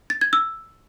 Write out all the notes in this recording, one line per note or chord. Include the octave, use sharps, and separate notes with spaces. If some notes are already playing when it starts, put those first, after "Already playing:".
A6
G#6
E6